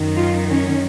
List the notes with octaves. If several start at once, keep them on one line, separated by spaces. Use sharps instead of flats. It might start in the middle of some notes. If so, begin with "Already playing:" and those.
Already playing: F#2 D#3
F4
C#4